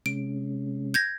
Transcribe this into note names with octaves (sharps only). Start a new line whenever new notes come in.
C3 G#3 C#4 D7
G6 G#6 A#6